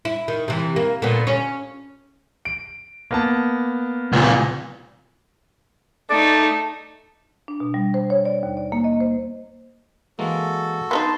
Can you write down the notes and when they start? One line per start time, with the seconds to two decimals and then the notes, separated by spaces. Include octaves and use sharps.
0.05 E4
0.28 D#3
0.48 C3 E3
0.76 A#3
1.02 A#2 D3 B3
1.27 C#4
2.45 D7
3.11 A#3 B3 A5
4.12 C#2 A#2
6.10 A3 D#4 D5
7.48 D4
7.60 B2
7.74 G3
7.94 C5
8.10 C#5
8.25 D5
8.43 D#2
8.57 D5
8.72 A#3
8.84 D#5
9.00 C5
10.19 E3 G#3 A#3 F#4 A4
10.91 B3 C4 D#4 A5 C6